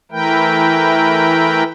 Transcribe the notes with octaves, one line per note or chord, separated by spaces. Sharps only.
E3 A3 E4 A#4 B4 G5